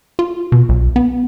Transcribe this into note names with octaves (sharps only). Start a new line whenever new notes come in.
F4
B2
B1
B3